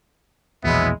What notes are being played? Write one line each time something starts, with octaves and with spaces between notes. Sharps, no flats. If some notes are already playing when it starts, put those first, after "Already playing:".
A#1 E2 B2 F#3 G#3 B3 E4